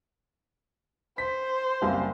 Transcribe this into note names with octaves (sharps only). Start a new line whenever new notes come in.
C5 B6
F#1 C2 F5